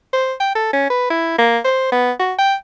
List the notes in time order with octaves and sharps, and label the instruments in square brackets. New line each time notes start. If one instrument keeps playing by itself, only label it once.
[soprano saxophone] C5
G5
A4
C#4
B4
E4
A#3
C5
B3
F#4
G5